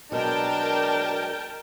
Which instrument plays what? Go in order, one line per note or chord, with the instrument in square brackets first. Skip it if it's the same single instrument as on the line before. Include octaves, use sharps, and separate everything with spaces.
[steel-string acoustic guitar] B2 F#3 G#3 [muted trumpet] D4 [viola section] A#4 G5 A5